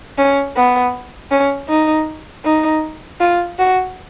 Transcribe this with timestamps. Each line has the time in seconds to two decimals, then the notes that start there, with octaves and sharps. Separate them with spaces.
0.18 C#4
0.56 B3
1.31 C#4
1.69 D#4
2.45 D#4
3.20 F4
3.59 F#4